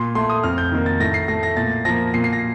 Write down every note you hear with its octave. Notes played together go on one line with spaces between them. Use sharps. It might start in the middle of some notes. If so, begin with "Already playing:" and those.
Already playing: A#2 C6
A3 C6
D#6
F2 F6
G6
D#3 A#3
A6
A2 A#6
C7
A3 A#6
A#6
A#2 A6
F3 A#3 A#6
A#2 C7
C7
A#6